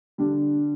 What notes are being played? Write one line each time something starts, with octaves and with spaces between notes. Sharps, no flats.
D3 G3 D4